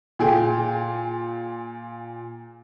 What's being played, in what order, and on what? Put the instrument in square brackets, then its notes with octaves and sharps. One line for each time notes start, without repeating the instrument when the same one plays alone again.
[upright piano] A#2 G#4 G5